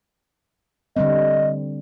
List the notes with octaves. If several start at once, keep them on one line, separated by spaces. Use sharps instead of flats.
D3 G3 C4 D#5